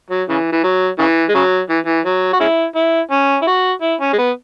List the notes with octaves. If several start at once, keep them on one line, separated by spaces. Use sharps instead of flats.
F#3
C#3 E3
E3
F#3
C#3 E3
G#3
C#3 F#3
E3
E3
F#3
F#4
G#3 C#4 E4
E4
C#4
E4
F#4
E4
C#4
G#3
B3